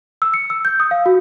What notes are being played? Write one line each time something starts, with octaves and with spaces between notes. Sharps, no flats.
E6
C#7
E6
G6
D#6
F5
F#4